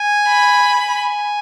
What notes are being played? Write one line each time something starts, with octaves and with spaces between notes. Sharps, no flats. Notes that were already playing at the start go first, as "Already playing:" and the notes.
Already playing: G#5
B5
G#5